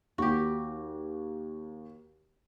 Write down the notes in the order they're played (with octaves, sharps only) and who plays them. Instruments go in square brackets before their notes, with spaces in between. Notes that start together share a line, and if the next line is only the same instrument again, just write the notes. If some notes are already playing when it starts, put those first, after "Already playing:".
[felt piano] D#2 [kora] F#4 G4